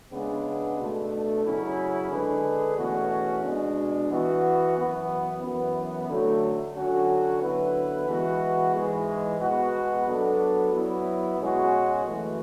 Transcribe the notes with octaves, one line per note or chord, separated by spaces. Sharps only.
C#3 G#3 B3 D4
B2 A3 D4 A4
F#2 C#3 F#3 C#4 E4
D3 G#3 D4 G#4 B4
E2 B2 A3 C#4 F#4
B2 G#3 D4
E3 B3 F#4
F#2 E3 B3
F#2 E3 B3
D3 F#3 A3
D3 F#3 C#4 F#4
D3 F#3 B3 E4 B4
E3 G#3 B3 F#4
G#2 E3 G#3
B2 G#3 B3 F#4
F#3 B3 D4 A4
F#3 B3 E4
B2 G#3 C#4 F#4
F#2 E3 A3